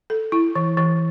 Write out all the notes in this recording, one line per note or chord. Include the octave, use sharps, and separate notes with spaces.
A4
E4
E3
E3